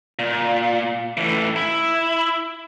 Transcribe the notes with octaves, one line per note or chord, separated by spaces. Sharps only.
A#2
A2 E3
E4